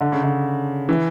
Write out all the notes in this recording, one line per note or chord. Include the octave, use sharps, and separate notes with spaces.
D3
C#3
D3
E3